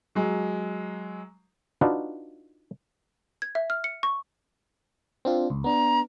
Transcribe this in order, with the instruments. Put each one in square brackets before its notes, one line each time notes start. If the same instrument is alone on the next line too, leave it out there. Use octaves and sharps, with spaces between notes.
[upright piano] F#3 G#3
[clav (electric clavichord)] D4 D#4 F4 F#4 B4
[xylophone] G#6
E5
F6
C#7
C#6
[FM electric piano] C4 D4 F4
C#2
[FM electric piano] B3 D4 [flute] A#5